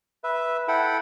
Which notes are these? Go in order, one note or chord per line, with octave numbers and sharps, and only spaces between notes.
B4 E5
E4 A4 F#5 G5 B5